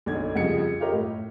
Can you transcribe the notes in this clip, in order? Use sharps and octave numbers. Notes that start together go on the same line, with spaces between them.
B1 D3 D#4 G#6
C2 F2 C#3 F3 G#6 C#7
F4 G4 A#4 C#5 D#5
A2